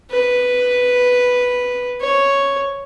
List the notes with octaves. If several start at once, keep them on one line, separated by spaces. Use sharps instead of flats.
B4
C#5